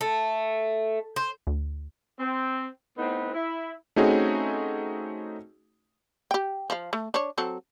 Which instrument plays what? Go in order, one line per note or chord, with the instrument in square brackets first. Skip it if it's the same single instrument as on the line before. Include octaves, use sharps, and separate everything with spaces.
[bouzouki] A3
C5
[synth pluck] D2
[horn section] C4
A2 B3 C4 D#4 B4
E4
[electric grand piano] A3 C4 C#4 D#4 F#4 G#4
[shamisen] G4 G5
F3 F5
A3
D4 C#5
F#3 C4 A4